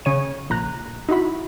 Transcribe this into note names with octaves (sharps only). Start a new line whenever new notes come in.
C#3 C#5 D#7
A#1 A#5 F#6
D#4 E4 F#4 B5